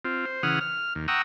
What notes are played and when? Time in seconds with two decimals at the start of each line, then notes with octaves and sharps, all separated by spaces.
0.05 C4 F4
0.26 C5
0.43 C#3 E3 F#5 D#6 F6
0.61 F6
0.95 D#2
1.08 F#5 G5 A#5 C#6 D#6 E6